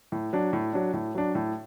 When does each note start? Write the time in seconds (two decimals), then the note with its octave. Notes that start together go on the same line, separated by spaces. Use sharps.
0.12 A2
0.33 F#3 D4
0.53 A2
0.73 F#3 D4
0.93 A2
1.15 F#3 D4
1.35 A2